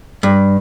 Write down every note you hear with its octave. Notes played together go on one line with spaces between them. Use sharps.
G2